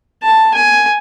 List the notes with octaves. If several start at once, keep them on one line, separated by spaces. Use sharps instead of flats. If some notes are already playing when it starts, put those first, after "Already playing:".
A5
G#5